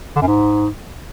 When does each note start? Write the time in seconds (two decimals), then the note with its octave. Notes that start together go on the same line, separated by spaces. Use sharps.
0.16 D3
0.22 F#2
0.27 G#2